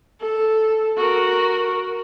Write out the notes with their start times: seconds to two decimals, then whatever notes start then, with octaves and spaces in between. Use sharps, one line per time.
0.21 A4
0.97 F#4 A#4